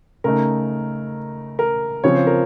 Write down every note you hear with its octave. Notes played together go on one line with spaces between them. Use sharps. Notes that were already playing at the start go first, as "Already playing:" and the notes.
C#3 A3 D#4 A#4
A#4
C#3 F3 C4 F4 C#5
C5
A#4